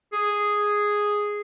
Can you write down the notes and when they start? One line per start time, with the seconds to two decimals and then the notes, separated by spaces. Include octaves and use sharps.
0.13 G#4